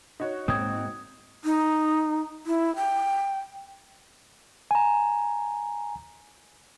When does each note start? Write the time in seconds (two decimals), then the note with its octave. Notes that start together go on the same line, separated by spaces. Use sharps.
0.20 D#4 F#4 C#5
0.48 G#2 G#3 A#3 C4 D#6 G#6
1.44 D#4
2.46 E4
2.76 G5
4.71 G#5 A#5